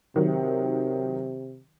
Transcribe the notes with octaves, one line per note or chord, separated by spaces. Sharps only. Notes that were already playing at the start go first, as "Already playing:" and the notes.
C3 D#3 F#3